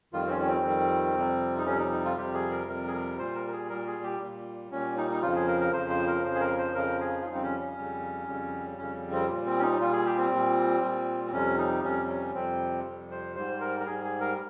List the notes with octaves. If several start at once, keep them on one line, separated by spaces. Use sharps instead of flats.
F2 D#3 G3 F4
C4
C#4
C#4
C4
F2 D#3 G3
F2 C3 G3
D#4
F2 C3 G3 C#4
D#4
D#4
F4
F2 C3 G3 G4
G#4
A#4
F2 C3 G3 A#4
G#4
A#4
A#2 G3 C5
A#4
A#4
G#4
A#2 G3 A#4
G#4
G4
A#2 G3
A#2 G3 C#4
D#4
D#4
F2 C#3 F3 F4
G#4
A#4
A#4
F2 C#3 F3 C5
C5
A#4
F2 C#3 F3 C5
G#4
A#4
C5
F2 C#3 F3 A#4
G#4
F4
F2 C#3 G3 D#4
C4
C#4
C#4
F2 C#3 G3
F2 C#3 G3
F2 C#3 G3 C#4
C4
A#2 G3
C4
C#4
D#4
A#2 G3 F4
G#4
G4
C4
A#2 G3
A#2 G3
C4
F2 C3 G3 C#4
D#4
F2 C3 G3 C#4
C#4
F2 C3 G3 C4
F2 C3 G3
C5
G#2 G3 C5
A#4
A#4
G#2 G3 G#4
G#4
A#4